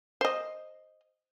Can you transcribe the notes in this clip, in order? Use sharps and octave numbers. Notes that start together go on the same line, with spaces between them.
C5 D#5